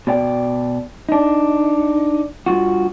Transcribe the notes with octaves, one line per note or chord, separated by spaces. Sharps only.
B2 D5 G5
D4 D#4
G2 F4 F#4